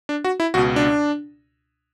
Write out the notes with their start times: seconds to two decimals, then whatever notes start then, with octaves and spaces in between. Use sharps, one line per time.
0.09 D4
0.24 F#4
0.40 E4
0.54 C#2 B2 F#4
0.76 D4